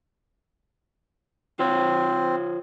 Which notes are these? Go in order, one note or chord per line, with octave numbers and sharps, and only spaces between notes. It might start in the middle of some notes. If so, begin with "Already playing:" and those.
C4 F4 C5 C#5